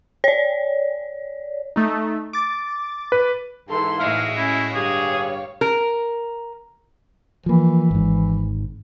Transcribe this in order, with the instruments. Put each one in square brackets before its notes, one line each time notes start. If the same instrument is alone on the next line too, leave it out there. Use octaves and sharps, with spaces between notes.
[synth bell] C#5 D5
[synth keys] A3 D#4
D6 A6
[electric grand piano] B4
[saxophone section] G#2 E3 [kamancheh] A4 C6
[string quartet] A2 G#3 F#4 [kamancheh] E5 [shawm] F5
[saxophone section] C#4 [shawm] E4
[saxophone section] G2 D3 G4 [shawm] G#4 [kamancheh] C#5 F5
[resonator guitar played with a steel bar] A#4
[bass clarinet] E3 [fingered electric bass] F3 A#3
[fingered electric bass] G#1 G#2